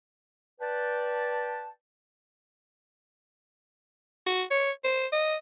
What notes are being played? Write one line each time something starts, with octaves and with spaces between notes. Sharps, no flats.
B4 D5 G5 A5
F#4
C#5
C5
D#5